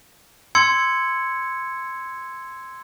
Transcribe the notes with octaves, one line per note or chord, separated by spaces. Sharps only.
C6 E6 G#6 C#7